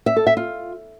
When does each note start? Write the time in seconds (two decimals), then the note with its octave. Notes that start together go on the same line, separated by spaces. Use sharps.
0.06 E5
0.16 A4
0.27 E5
0.37 F4